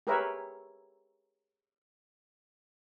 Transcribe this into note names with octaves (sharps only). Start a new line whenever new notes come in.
G4 G#4 A#4 B4 C#5 E5